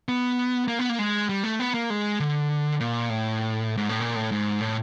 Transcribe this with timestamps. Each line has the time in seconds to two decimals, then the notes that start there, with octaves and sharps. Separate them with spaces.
0.08 B3
0.68 A#3
0.79 B3
0.89 A#3
0.99 G#3
1.29 G3
1.44 A3
1.60 B3
1.74 A#3
1.90 G#3
2.20 D3
2.80 A#2
3.10 A2
3.77 G#2
3.89 A2
4.00 A#2
4.16 A2
4.32 G#2
4.61 A2